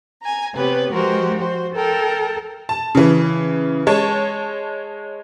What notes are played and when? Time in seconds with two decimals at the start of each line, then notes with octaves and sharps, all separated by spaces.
0.22 G#5 A#5
0.54 C3 B3 G4 B4 C#5
0.91 F3 G#3 F#4 G4 A#4 C5
1.39 F#4 C5
1.74 A4 A#4 G5
2.69 A5
2.95 C#3 E3
3.87 G#3 C#5 A5